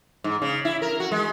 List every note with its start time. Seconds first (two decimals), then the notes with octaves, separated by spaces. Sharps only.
0.24 G#2
0.42 C#3
0.65 E4
0.82 A#4
1.00 F#4
1.12 G#3